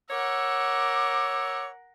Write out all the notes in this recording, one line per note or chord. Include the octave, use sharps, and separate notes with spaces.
A#4 C#5 F#5 D6 E6